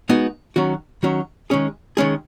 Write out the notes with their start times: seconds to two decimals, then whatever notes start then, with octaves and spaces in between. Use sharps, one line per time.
0.09 G#3 B3 D#4 F#4
0.56 D#3 F#3 C#4 F#4
1.03 D#3 F#3 C#4 F#4
1.50 D#3 G#3 C#4 G#4
1.97 D#3 G#3 C#4 G#4